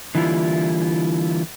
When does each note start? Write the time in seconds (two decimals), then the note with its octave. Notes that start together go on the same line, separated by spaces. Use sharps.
0.15 D3 E3 G3 A#3 E4 F4